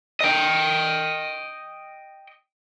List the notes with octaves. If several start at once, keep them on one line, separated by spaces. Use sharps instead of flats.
D#5 G5